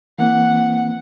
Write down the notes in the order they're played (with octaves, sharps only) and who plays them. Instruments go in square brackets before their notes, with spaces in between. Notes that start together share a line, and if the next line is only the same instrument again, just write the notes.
[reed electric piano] E3 A#3 C4 [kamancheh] F#5